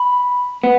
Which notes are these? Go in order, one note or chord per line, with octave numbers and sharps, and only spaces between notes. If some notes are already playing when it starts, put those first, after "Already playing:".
Already playing: B5
B3